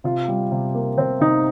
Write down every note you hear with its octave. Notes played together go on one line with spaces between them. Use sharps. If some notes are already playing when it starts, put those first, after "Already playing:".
C3 F4
G3
C3
A#3
C3 C4
C3 D#4